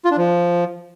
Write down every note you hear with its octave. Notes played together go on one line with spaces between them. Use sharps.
F4
D4
F3